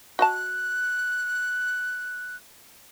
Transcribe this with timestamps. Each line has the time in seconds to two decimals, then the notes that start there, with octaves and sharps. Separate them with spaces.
0.19 F#4 D#5 A5 F#6